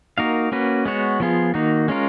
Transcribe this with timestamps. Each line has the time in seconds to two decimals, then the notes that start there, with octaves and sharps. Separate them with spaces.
0.18 A#3 D#4 F#4 A#4 F5
0.52 A#3 C#4 F#4 B4
0.85 G#3 B3 F#4 C#5
1.20 F3 B3 F4 G#4
1.54 D#3 A#3 D#4 F#4
1.88 G#3 C#4 F4 A#4